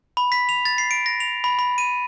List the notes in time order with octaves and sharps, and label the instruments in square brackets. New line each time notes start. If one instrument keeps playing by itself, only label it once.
[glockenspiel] B5
B6
F7
A6
C7
D7
A#6
F7
B5
B5
D#7